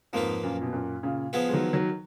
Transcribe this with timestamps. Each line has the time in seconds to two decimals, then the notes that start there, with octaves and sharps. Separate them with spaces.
0.13 F2 G#2 F3 A#3 F4 B4
0.43 F#2 A#2
0.62 B2
0.73 F#2 A#2
1.03 A#2 C#3
1.33 F3 B3 F4 G#4 B4
1.49 G#3
1.53 D#3 F#3
1.73 D#3 F#3